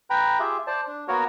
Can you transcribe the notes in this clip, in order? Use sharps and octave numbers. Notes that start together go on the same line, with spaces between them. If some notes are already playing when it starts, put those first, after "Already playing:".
B4 G5 A#5 B5
F4 G4 G#4 E5
C5 D5 A5
D4
A#3 B3 F#4 A#4 C#5